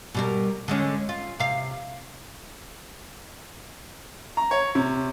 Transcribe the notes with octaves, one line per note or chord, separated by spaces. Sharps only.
B2 G3 A#4
D3 G#3 C#4
F4
C3 F5
A#5
C#5
C3